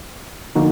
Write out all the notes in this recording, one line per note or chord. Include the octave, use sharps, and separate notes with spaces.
D3 F3 A#3 D#4 F#4